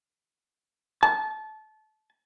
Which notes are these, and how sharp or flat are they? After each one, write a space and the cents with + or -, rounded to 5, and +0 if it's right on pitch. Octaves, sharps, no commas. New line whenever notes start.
A5 -25